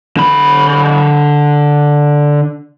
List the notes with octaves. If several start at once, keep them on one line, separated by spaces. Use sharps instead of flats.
D3 B5